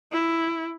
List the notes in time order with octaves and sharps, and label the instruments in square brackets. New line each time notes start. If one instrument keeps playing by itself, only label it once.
[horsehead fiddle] E4